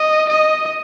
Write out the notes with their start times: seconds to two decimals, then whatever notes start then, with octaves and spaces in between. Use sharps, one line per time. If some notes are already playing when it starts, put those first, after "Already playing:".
Already playing: D#5
0.30 D#5